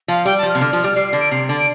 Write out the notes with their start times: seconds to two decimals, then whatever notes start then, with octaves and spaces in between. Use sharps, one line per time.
0.08 F3 F5
0.25 G3 G5
0.37 A5
0.43 F3
0.48 F6
0.55 C3
0.61 D3 F6
0.73 F3
0.84 G3
0.96 G3 C7
1.07 C7
1.13 D3
1.19 D7
1.31 C3 C7
1.49 D3 A6
1.59 D7